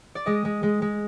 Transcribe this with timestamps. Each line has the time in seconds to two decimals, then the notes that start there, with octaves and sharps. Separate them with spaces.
0.15 D5
0.26 G#3 D#5
0.45 G#3
0.63 G#3
0.82 G#3